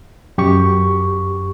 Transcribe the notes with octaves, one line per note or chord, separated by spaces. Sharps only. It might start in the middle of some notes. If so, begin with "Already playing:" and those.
F#2 G4 C#6